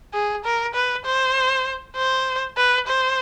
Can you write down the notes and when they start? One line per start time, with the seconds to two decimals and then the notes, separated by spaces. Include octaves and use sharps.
0.14 G#4
0.45 A#4
0.75 B4
1.05 C5
1.96 C5
2.57 B4
2.87 C5